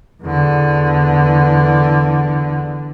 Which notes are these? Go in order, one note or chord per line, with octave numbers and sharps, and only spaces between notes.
E2 D3